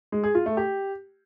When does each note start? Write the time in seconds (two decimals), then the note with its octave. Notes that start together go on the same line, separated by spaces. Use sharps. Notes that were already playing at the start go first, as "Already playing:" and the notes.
0.12 G#3
0.24 G#4
0.35 F4
0.46 A3
0.57 G4